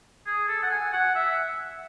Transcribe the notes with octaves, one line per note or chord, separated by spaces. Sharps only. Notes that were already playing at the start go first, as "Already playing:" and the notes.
G#4
A4
F#5
G#5
F#5
E5